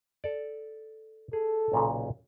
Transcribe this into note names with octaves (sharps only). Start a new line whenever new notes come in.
A4 D5
G#4 A4
B1 A#2 C#3